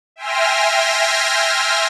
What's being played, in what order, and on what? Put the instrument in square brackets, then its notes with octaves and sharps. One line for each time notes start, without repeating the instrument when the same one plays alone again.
[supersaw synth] E5 G5 G#5 C6 F6 A#6